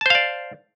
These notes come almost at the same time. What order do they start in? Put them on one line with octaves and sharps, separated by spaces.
A5 C5 F5 D5